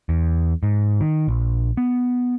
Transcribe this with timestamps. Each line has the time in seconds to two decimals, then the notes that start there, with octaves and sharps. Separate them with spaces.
0.09 E2
0.63 G#2
1.01 D#3
1.28 A#1
1.77 B3